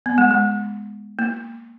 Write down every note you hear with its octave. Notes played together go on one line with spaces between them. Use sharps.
B3
G#3
G#3
A#3